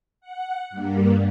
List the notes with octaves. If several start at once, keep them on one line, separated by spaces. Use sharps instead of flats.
F#5
G2 G3 A#3